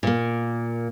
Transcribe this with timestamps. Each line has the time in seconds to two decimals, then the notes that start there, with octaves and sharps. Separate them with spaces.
0.03 A#2 A#3